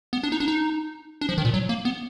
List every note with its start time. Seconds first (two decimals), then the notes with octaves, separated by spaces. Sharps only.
0.13 B3
0.23 D4
0.32 D#4
0.40 D4
0.48 D#4
1.21 D4
1.29 F3
1.38 D#3
1.45 A#2
1.54 F#3
1.69 A#3
1.85 B3